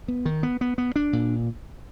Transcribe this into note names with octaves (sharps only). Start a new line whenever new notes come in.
B3
D#3
B3
B3
B3
D4
A#2